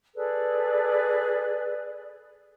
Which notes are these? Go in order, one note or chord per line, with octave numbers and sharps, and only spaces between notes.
G#4 A4 B4 D5